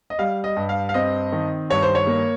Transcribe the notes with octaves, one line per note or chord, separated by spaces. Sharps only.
D#5
G3 F5
D#5
G2
F5
F5
C4 D#5
D#3
G2 C#5
C5
C#5
A#3